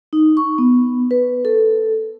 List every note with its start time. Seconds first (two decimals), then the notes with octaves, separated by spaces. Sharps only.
0.13 D#4
0.37 C#6
0.58 B3
1.11 B4
1.45 A4